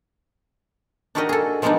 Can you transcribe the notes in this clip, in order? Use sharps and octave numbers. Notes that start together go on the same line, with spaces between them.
D4 D#4 F#4 G4 A#4 D#5
G#4 A4
F3 G#3 A#3 B3 D4 D#4